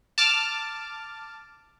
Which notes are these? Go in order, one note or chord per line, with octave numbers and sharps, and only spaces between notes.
A5 D6 F6